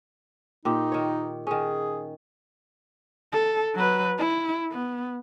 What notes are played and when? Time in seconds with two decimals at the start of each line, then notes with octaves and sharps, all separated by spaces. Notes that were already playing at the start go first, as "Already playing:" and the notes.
0.65 A#2 D#4 G4
0.92 D#3 C#5
1.47 D#3 C#4 G#4
3.32 A4
3.75 F#3 B4
4.19 E4
4.71 B3